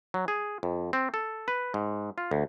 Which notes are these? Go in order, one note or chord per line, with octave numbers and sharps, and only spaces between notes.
F#3
G#4
F2
C4
A4
B4
G#2
F4
D2